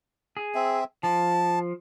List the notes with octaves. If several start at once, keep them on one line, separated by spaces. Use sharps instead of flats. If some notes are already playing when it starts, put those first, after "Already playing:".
G#4
C4 E5
F3 A5